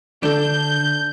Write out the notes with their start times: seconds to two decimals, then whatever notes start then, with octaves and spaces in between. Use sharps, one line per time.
0.23 D3 D4 A4 G6